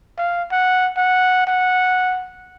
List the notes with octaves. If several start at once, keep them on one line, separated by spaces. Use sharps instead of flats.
F5
F#5
F#5
F#5